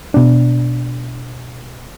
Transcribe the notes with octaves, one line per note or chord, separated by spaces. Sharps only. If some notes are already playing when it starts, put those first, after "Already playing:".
B2 D4